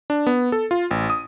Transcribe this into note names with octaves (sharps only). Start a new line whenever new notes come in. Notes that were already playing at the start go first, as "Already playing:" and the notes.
D4
B3
A4
F4
A1
D#6